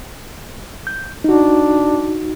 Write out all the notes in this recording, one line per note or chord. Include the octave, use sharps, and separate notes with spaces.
G6
D4 D#4 F#4